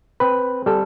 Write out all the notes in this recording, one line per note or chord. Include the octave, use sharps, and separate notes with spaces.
C4 B4
G3 A4